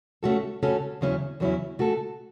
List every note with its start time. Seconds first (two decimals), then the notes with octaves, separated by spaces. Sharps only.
0.23 C#3 A3 C#4 F#4 A4
0.63 C#3 A3 C#4 F#4 A4
1.01 E2 C#3 F#3 C#4 E4
1.40 E2 C#3 F#3 C#4 E4
1.79 C#3 A3 F#4 A4